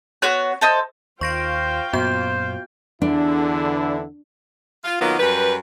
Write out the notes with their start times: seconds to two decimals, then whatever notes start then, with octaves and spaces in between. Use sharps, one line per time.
0.22 B3 F#4 C#5 F#6
0.61 A4 C5 D#5
1.21 D#2 F4 C5 F5 G5 C#6 A#6 D7
1.93 F#2 A#2 B3 F#4 C5 G6
3.02 E2 D3 D4 E4
4.84 F4
5.01 D#3 F#3 A#3 B3 F4
5.19 F#2 G3 B4